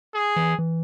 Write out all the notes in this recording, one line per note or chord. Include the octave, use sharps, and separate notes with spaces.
G#4
E3
E3